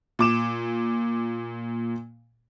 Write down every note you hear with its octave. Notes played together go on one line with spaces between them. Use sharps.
A#2 D6 E7